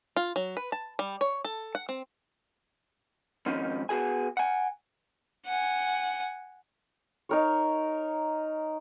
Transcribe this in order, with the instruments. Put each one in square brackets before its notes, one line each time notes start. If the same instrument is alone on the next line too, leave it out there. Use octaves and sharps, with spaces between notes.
[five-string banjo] F4
F#3
B4
A5
G3
C#5
A4
F#5
C4
[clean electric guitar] G#2 D#3 F3 C4 C#4 D#4
B3 F#4 G#4 G#5
F#5 G#5
[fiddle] F#5 G#5
[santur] D#4 A#4 C#5